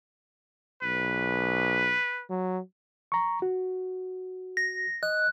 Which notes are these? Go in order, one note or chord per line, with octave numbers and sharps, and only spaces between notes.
B1 B4
F#3
A#5 C#6
F#4
A#6
D#5 F#6